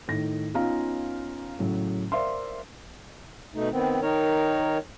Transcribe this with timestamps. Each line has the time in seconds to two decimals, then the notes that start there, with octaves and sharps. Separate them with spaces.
0.08 A2 D#3 A#6
0.54 B3 C#4 D#4 F4 F5 A#5
1.59 A2 C#3 F#3
2.12 A#4 C5 D5 E5 F5 C6
3.54 B2 A3 D#4
3.71 D#3 B3 C4
4.02 D#3 D#4 A#4 C#5